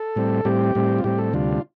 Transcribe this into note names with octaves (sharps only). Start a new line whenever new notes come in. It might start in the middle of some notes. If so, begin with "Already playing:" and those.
Already playing: A4
A2 G3 C4
A2 G3 C4 G4
A2 G3 C4
F4
A2 G3 C4 G4
A4
D2 C3 G3 D4 F4